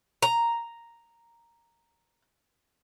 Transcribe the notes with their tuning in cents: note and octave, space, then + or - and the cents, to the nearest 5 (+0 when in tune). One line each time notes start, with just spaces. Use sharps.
A#5 +0